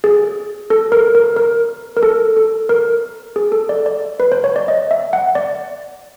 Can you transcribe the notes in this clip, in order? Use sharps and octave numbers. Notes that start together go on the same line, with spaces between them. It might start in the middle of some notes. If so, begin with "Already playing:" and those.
G#4
A4
A#4
A#4
A#4
A#4
A4
A4
A#4
G#4
A4
D5
D5
B4
C5
C#5
D5
D#5
E5
F#5
D5